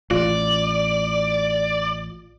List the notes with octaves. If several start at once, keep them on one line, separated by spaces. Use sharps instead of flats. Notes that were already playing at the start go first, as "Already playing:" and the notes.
A1 F4 D5